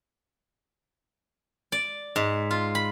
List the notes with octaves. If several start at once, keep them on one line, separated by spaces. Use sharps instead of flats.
D5
G#2
F4
B5